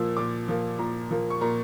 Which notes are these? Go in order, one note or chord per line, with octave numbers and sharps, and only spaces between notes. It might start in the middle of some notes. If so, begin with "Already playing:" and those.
Already playing: A#2 F3 A#3 E6
A#2 D6
F3 A#3
A#2 A#5
F3 A#3
C#6
A#2 A#5